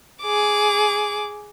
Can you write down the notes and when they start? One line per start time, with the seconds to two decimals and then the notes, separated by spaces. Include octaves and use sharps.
0.23 G#4 D6